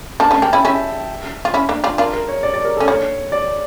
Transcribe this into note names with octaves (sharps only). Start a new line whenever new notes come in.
A#3 D4 A5
A3 C#4
A#3 G5
C#4 E4
C#4 E4 E5
F4
C#4 E4
A#3 D4
D4 F4
D4 F4 A#4
A#4
C#5
D5
D5
A#4
C#4 A4
A#3 D4 C#5
D5